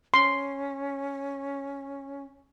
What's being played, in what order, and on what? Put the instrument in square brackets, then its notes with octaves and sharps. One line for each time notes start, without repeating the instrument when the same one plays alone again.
[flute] C#4 [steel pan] C6